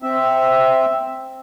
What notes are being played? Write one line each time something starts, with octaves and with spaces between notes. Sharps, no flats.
C4 E5